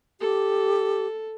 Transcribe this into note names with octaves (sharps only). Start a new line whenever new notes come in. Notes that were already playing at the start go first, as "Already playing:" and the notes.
G4 A4